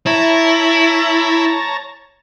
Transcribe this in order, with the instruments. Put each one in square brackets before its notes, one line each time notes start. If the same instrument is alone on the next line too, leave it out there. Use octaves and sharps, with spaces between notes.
[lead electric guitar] E4 [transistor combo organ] C#5 A5 A#5